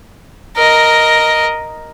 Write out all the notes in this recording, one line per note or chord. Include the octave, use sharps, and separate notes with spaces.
A#4 D#5